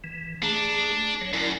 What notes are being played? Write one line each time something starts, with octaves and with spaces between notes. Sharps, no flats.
E3
A3 D4 G#4 A#5
F#1 F#3 C#5
F#2 E4 A#4 D5